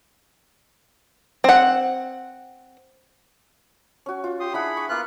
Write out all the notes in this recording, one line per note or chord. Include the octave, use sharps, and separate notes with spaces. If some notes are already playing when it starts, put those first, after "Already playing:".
C4 F#5
C#4 F#4
F4
G4 C6 D#6
D4 E4 G#4 F#5 B5
C#6
A#3 B3 F4 F#6